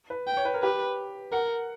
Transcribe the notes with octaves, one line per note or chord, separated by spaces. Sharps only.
B4
G5
C#5
B4
A#4
G4 B4
A#4 F#5